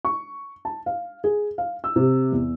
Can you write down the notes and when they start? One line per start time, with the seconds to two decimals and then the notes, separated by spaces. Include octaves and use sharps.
0.05 C#6
0.65 A5
0.86 F5
1.24 G#4
1.58 F5
1.84 E6
1.96 C3
2.32 E2